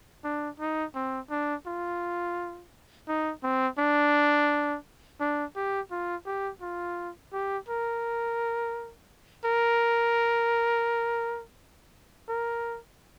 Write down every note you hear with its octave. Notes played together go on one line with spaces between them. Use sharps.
D4
D#4
C4
D4
F4
D#4
C4
D4
D4
G4
F4
G4
F4
G4
A#4
A#4
A#4